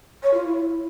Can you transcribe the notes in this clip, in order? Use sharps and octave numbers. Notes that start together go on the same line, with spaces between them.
C#5
F4
E4